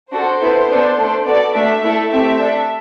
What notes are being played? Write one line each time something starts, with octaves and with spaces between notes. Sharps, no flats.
D4 F#4 A4 C5
B3 E4 A4
B3 D4 A4
A3 D4 A4
B3 F#4 A4 D5
A3 D4 A4 E5
A3 E4 A4
A3 C4 G4 E5
D4 A4